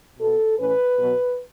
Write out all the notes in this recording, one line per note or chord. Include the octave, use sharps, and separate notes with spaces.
B2 B3 A4
A2 E3 C#4 B4
B2 F#3 B3